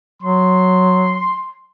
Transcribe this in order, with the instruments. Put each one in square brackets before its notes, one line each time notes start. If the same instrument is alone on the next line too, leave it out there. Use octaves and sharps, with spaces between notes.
[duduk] F#3 [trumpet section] C6